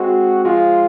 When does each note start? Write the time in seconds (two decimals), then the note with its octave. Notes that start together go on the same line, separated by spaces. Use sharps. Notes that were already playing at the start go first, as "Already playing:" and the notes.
Already playing: G#3 C4 F#4
0.45 F3 G#3 F4